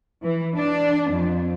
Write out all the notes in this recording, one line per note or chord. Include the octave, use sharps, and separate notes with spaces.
E3
D4
F2